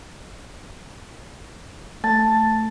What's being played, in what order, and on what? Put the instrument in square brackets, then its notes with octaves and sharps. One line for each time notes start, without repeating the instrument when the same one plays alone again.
[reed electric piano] A3 [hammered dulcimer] A5